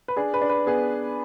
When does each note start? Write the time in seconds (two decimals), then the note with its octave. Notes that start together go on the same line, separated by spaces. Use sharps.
0.08 B4
0.17 D4 G#4
0.34 B4
0.42 D4
0.49 B4
0.66 B3 G#4